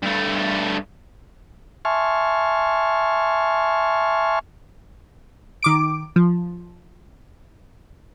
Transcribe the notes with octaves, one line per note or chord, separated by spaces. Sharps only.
G2 A3
E5 G#5 A5 C6 C#6 F6
D#3 D6 D7
F3